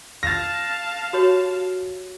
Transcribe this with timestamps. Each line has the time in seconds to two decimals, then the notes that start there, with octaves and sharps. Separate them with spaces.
0.23 F5 A5 A6 A#6
1.13 F#4 G4 C#5